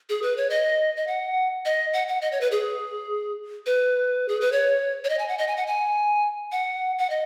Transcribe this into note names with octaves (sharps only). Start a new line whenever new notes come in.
G#4
B4
C#5
D#5
D#5
F#5
D#5
F#5
F#5
D#5
C#5
B4
G#4
B4
G#4
B4
C#5
C#5
D#5
G#5
F#5
D#5
G#5
F#5
G#5
F#5
F#5
D#5